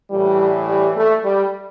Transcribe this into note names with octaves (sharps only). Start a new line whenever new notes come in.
A2 E3 G3
G3
A3
G3